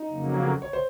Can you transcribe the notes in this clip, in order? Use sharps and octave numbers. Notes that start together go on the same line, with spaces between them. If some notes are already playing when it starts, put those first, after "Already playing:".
Already playing: D#4
F2 C#3 F#3 A#3
C#5
C5